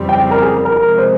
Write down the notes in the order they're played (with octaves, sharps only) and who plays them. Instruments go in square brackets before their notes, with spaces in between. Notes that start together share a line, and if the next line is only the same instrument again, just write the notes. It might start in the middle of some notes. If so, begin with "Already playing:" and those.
Already playing: [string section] F2 C#3 E3 G3 C4
[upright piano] G5
A#4
G#4
A#4
A#4
[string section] C3 F3 G#3 [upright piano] A#4
[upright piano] C5